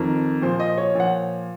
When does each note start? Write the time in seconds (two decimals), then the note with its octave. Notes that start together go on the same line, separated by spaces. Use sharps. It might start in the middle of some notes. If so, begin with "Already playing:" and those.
Already playing: F2 D#3 A#4
0.42 A#2 F3 C5
0.60 D#5
0.78 C#5
0.95 A#2 F3 F#5